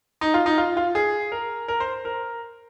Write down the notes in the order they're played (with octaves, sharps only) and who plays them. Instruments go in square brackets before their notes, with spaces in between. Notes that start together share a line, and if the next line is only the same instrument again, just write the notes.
[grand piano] D#4
F4
D#4
F4
F4
G#4
A#4
A#4
C5
A#4